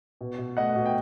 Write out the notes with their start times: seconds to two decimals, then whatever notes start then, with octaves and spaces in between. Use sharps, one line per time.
0.21 B2
0.38 B2
0.57 A3 D#5 F#5
0.76 B2
0.86 G5